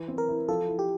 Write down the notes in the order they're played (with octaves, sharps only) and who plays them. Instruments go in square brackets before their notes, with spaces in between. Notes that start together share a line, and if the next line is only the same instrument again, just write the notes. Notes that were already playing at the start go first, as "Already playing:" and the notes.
Already playing: [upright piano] E3
C4
[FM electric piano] A#4
[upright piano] E4
[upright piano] F3 [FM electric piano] A4
[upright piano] E4
[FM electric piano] G4